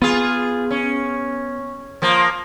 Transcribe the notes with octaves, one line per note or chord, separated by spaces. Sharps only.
B3 F4 G#4
C#4
F3 A#3